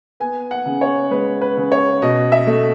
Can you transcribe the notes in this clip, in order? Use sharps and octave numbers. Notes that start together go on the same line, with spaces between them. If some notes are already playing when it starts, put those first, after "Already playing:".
B3 G#5
F#5
C#3
C#5
G#3 B4
B4
C#3
C#5
B2 D#5
E5
A3